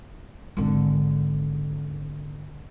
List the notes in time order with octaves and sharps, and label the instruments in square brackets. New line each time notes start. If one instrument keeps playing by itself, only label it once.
[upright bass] G#1 D3